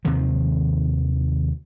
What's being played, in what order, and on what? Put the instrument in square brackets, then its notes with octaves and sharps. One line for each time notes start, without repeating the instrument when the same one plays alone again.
[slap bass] D#2 C3 D#3 F3